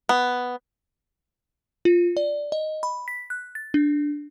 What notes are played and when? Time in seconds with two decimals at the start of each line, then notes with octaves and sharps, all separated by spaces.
0.09 B3
1.85 F4
2.17 D5
2.52 D#5
2.83 B5
3.08 B6
3.30 F#6
3.55 A6
3.74 D4